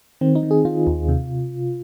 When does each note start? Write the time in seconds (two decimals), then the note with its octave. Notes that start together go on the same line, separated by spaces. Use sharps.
0.21 D#3 C4
0.35 D#4
0.43 D#3
0.51 G#4
0.65 D#3 F4
0.87 D#2
1.08 C3